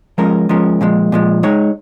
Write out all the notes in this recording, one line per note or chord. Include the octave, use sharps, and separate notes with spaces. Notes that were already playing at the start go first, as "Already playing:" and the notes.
F3 G#3 C#4 A#4
F3 G#3 C#4 A#4
A#2 F3 G#3
A#2 F3 G#3
G#3 D#4 C#5